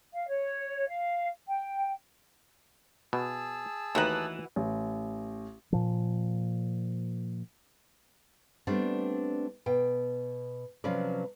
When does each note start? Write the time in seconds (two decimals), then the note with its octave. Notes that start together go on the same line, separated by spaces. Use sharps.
0.13 F5
0.27 C#5
0.88 F5
1.47 G5
3.13 B2 G#4 A5 E6
3.95 D#2 E3 A3 D#4 F#4 B4 F#5
4.56 A1
5.72 A#2 F3
8.67 G3 A3 B3 C4 D4
9.66 B2 G5
10.84 C3 F3 F#3 C#4 B4 D5